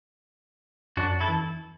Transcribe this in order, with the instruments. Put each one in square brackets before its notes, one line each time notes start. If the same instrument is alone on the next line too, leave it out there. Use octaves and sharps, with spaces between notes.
[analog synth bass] F#2 [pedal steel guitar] D4 F#4
[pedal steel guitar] E4 A4
[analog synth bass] E2